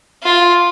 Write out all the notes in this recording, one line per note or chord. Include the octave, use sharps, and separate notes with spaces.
F4